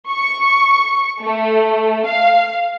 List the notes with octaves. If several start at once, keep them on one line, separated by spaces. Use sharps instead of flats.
C#6
A3
F5